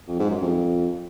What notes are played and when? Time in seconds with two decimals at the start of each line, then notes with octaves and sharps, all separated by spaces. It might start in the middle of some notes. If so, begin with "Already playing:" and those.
0.08 F2
0.19 G#2
0.30 F#2
0.41 F2